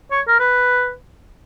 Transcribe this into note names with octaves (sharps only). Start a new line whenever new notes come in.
C#5
A#4
B4